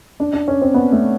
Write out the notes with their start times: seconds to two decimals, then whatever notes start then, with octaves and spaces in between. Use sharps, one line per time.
0.20 D4
0.33 D4
0.48 C#4
0.62 C4
0.74 B3
0.92 A3